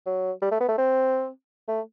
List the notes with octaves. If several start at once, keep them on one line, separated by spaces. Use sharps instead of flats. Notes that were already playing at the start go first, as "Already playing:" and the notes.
F#3
G3
A3
B3
A3
C4
A3